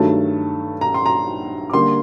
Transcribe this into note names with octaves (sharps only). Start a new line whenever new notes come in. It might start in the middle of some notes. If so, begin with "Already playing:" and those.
Already playing: G2 D#3 F#3 A3 A5
A#5
C6
A#5
D6
D3 G3 A#3 C6